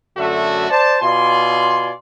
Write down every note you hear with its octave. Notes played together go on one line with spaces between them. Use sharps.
F#2 D3 A3 F#4 E5
C5 D5 A5
B2 F4 D5 G#5 C6